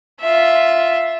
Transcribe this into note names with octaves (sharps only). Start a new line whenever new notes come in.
F4 E5